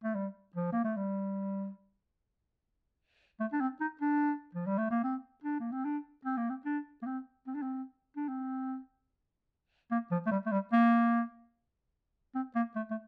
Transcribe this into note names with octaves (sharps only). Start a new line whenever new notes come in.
A3
G3
F3
A#3
A3
G3
A3
D4
C4
D#4
D4
F3
G3
A3
A#3
C4
D4
A#3
C4
D4
C4
A#3
C4
D4
A#3
C4
C4
D4
C4
D4
C4
A#3
F3
A3
G3
A3
G3
A#3
C4
A#3
A3
A3